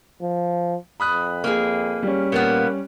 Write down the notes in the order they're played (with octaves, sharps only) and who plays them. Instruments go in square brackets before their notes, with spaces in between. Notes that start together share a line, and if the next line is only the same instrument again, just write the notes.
[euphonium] F3
[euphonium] F2 [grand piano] B5 D#6 F#6
[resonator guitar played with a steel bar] A#3 G#4
[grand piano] G3 C#4
[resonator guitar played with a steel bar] A#2 A#3 B3 [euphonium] A#4